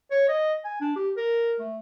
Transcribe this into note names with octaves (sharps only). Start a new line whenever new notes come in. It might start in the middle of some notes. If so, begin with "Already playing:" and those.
C#5
D#5
G#5
D4
G4
A#4
A3